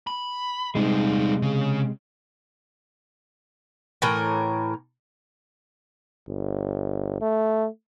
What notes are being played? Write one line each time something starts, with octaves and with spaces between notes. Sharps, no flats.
B5
C3 G3 G#3 D#4
C#3
A2 E3 A#4
G1
A3